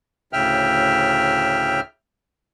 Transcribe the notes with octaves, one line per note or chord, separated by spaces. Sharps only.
D2 A2 C#3 E5 G5 F6